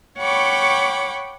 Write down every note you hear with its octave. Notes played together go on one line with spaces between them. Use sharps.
C#5 F#5 G5 B5 C#6 D6